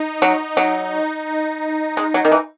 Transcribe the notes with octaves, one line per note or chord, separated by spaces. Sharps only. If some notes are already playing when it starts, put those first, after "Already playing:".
Already playing: D#4
F#3
F#3
G#3
F#3
D#3
E3